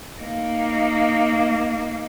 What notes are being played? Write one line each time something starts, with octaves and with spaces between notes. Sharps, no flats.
A#3 D#4